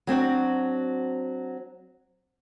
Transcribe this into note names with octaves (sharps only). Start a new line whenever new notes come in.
F#3 C4 D4 F#4